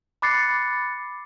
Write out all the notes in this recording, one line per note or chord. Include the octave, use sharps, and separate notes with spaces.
B5 D6 F#6 A6 C7 C#7